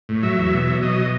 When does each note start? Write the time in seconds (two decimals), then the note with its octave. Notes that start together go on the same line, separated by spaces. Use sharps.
0.09 A2
0.23 F#3 E5
0.38 E2
0.53 B2
0.68 F#3
0.83 B2 D#5